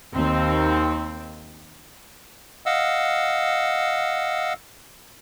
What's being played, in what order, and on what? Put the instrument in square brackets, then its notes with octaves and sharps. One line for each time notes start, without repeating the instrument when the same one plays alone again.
[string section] D#2 C4
[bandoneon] D#5 F5 F#5 E6